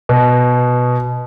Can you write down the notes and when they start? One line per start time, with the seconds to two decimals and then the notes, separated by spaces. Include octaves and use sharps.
0.09 B2